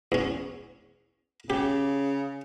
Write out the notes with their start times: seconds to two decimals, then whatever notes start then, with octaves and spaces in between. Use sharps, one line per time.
0.12 E2 C#4
1.50 C#3 G4